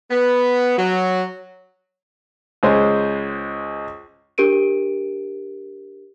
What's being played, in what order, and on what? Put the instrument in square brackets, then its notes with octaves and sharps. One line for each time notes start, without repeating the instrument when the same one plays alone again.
[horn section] B3
F#3
[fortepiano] C#2 G#3 C5
[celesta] D4 G4 A#4 D7 D#7